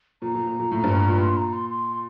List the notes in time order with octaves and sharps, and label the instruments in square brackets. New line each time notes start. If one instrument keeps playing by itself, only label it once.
[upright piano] A#2 [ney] A#5
[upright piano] A#2
A#2
A#2
A2
G2
A#2
[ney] C6
A#5
C6
C6
C6